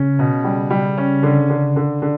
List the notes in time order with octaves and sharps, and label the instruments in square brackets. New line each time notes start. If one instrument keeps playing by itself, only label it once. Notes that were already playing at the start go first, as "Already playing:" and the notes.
Already playing: [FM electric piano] C#3 [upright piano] C#4
[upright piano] B2
G3
G3
C#4
D3
D3
D3
D3